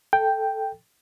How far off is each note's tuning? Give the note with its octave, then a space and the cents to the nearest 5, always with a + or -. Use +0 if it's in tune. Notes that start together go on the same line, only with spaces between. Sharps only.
A4 +0 G5 +0